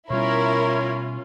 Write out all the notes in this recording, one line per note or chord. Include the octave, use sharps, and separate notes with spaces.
B2 G3 C#4 E4 F4 A#4 C#5